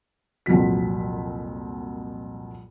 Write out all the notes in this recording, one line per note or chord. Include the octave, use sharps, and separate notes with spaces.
C2 F2 A#2 F#3 B6